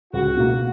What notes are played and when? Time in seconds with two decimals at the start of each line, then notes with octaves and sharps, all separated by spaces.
0.13 C#2 F#4
0.37 B2 A#3